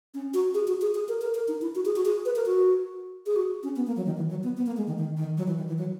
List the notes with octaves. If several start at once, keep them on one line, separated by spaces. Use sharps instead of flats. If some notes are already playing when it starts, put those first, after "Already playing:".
C#4
F#4
G#4
F#4
G#4
G#4
A#4
A#4
A#4
D#4
E4
F#4
G#4
F#4
G#4
B4
A#4
F#4
G#4
F#4
C#4
B3
A#3
F#3
D#3
E3
F#3
B3
B3
A#3
G#3
D#3
D#3
D#3
F#3
E3
D#3
E3
F#3